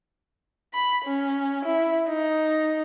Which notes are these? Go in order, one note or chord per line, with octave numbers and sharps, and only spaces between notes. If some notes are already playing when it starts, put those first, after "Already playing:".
B5
C#4
E4
D#4